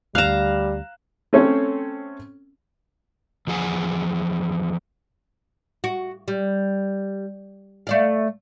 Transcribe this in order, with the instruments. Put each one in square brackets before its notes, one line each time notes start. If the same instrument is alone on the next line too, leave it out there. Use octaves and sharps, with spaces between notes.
[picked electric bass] D2 [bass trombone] G3 [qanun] F5 A#5 [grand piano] F#6 E7
[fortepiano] A3 C4 C#4 A4 C#5
[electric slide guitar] E2 F3 G#4 F#5 G#5
[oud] F#4
G3
A3 D5 F5